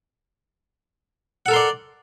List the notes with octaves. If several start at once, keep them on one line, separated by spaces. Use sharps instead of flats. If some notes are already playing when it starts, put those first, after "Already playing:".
A4 A#4 D5 F#5 C6